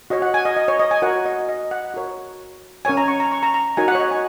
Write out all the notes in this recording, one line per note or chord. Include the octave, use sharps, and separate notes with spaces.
F#4 C#5 D#5
F#5
G#5
D#5
D#5
C#5
D#5
G#5
F#4 A#4 C#5 F#5
D#5
D#5
F#5
F#4 A#4 C#5
C#4 A#4 C#5 G#5
A#5
C#6
A#5
C#6
A#5
A#5
D#4 F#4 A#4 C#5 G#5
F#5
C#5
D#5
G#5